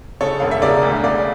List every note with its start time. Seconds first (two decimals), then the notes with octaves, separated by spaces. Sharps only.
0.21 C#3 A4 C#5
0.40 E1 F5
0.51 E5
0.62 C#3 A#4 D5
0.83 D2
1.03 C#3 D5 F5